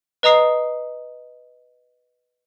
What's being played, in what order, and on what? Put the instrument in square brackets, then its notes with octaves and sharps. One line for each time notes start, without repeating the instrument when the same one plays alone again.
[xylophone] B4 D#5 A#5 D#6 C7